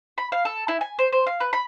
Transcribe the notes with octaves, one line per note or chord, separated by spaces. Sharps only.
B5
F5
A4
E4
G#5
C5
C5
F5
B4
B5